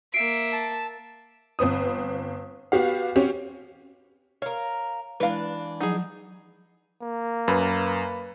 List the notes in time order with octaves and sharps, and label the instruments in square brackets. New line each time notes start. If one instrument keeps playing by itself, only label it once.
[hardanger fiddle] A#3 E5 [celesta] C7 D7
[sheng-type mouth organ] A5
[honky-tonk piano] G1 C4 B4 D#6
B3 F#4 G4 F5
C4 C#4 F#4 G4
[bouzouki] A#4 F5 [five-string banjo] C#5
[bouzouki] E3 D4 [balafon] G#3 E4 [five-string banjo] B4 F5
[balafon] F3 F#3 F#5 [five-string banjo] D#4 G#4
[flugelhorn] A#3
[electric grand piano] F#2 [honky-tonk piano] B4